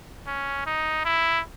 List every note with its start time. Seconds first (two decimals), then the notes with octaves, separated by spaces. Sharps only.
0.27 C#4
0.66 D#4
1.05 E4